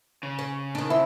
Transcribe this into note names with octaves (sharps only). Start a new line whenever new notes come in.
C#3
C#4
D#3 D4
C4 E4